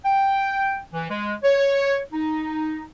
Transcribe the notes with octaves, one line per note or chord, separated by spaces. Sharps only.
G5
E3
G#3
C#5
D#4